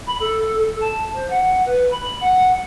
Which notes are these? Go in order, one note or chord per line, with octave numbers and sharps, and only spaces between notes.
B5
A4
A4
A5
C5
F#5
B4
B5
F#5